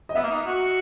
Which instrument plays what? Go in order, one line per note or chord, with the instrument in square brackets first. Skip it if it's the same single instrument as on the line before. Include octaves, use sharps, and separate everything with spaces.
[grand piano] D#5
[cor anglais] B3 [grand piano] E5
[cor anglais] A#3
D#4
F#4